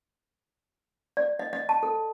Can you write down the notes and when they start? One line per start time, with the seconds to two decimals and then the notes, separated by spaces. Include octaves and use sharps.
1.17 D5
1.39 D#5
1.53 D#5
1.69 A5
1.83 A4